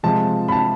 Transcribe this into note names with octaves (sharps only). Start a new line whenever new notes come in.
C3 F3 G#3 A5
B5
A5